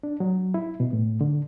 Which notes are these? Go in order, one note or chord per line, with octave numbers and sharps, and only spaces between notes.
D4
F#3
E4
B2
A2
D3